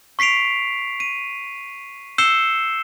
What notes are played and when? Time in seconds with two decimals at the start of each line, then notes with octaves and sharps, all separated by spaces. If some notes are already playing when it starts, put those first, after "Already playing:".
0.19 C#6 B6 C7 D7 F7
1.00 D#7
2.18 E6 G6 C7 C#7 E7 G7